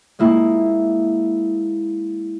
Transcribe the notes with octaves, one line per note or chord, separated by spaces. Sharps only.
G#3 A#3 E4